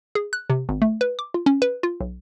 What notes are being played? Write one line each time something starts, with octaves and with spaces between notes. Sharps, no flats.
G#4
F#6
C3
G#1
A3
B4
D6
F4
C#4
B4
F4
B1